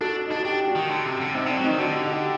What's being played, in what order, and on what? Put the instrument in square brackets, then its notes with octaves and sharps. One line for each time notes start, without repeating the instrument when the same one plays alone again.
[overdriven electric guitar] D4 [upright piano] F#4 A4
[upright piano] D#4
[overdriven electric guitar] D4
[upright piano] F#4
[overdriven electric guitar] D4 [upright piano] D#4 G4
[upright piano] D4 F#4
[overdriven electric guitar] D#3
D3
C3
D3
[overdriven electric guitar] C3 [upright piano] C4 D#4
[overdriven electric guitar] D3 [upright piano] D4
[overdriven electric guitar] F#3
[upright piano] C4 D#4
[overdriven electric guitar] D#3
[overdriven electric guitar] D3 [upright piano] D4 F#4
[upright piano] D#4 G4
D#4 G4
D#4 G4